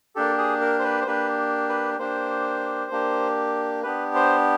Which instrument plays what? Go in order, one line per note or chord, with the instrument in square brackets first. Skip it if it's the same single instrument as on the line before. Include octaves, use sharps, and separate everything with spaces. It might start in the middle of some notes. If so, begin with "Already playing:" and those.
[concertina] A#3 D4 G4 A4
G#4
A#4
C5
B4
C5
A#3 D4 G4 B4
B4
A#3 D4 G4 C5
A#3 D4 G4
B3 D4 G4 B4
C5